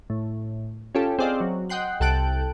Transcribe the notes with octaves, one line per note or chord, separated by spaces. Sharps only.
A2
C#4 F4 G4 A4
C4 G#4 D5 D#5 F5
F#3
D#5 F#5 G5 C6 F#6
C2 A4 G5 A5 F#6 D7